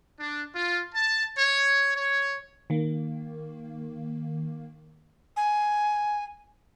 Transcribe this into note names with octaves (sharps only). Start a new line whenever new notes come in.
D4
F4
A5
C#5
C#5
D#3 A#3
G#5